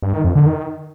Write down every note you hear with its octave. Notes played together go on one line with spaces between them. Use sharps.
G2
D#3
F2
D3
D#3